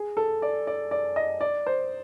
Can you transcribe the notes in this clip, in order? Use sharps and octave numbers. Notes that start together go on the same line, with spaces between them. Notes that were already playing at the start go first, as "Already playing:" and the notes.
Already playing: G#4
A4
D5
D5
D5
D#5
D5
C5